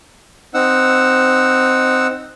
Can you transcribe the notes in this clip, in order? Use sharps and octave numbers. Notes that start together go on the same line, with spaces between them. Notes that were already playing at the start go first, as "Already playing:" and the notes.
C4 D#4 F#5 E6